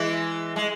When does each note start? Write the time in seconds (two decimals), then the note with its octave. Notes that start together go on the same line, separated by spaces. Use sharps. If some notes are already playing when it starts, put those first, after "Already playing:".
Already playing: E3 G#3
0.56 G#3